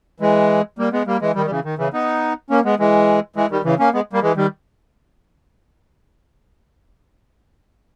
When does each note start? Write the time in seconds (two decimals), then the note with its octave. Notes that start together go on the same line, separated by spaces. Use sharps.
0.20 E3 G#3
0.78 G3 A#3
0.92 G#3 B3
1.07 G3 A#3
1.21 E3 G#3
1.35 D#3 G3
1.46 G3
1.50 C#3 E3
1.65 D#3
1.78 C#3 E3
1.93 B3 D#4
2.50 A#3 C#4
2.65 G#3 B3
2.79 E3 G#3
3.36 E3 G#3
3.50 D#3 G3
3.65 C#3 E3
3.79 A#3 C#4
3.93 G#3 B3
4.13 G3 A#3
4.22 E3 G#3
4.36 D#3 G3